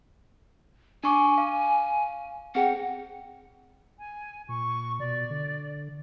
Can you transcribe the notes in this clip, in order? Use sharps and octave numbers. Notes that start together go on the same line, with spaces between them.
D4 G#5 C#6 D6
F5
C4 G#4 F#5 G5
G#5
A#2 C#6
B2 D5
D3